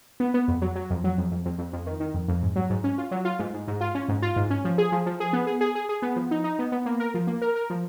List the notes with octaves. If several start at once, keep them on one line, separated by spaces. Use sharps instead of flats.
B3
B3
F2
F#3
F#3
F2
F#3
F2
F2
F2
F2
F2
D#3
D#3
F2
F2
G#2
F#3
G#2
C#4
F4
F#3
F4
G#2
G#2
G#2
F4
C#4
G#2
F4
G#2
C#4
F3
G#4
F3
F3
G#4
B3
G#4
G#4
G#4
G#4
B3
F3
D#4
D#4
B3
B3
A#3
A#4
F3
A#3
A#4
A#4
F3